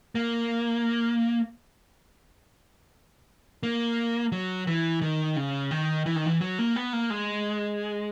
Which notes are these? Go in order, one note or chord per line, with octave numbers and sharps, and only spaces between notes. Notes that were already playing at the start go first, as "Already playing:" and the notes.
A#3
A#3
F#3
E3
D#3
C#3
D#3
E3
D#3
E3
F#3
A#3
B3
A#3
G#3